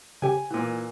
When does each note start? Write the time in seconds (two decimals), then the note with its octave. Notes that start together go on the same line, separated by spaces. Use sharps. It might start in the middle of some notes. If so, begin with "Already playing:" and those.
0.22 C#3 G4 G#5
0.50 A#2 E3